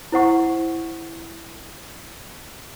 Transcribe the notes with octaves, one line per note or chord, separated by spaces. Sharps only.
E4 C5 F#5 C#6